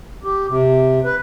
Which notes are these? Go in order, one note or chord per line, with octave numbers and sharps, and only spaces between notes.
G4
C3
B4